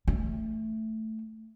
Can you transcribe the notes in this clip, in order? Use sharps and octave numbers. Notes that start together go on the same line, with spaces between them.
A3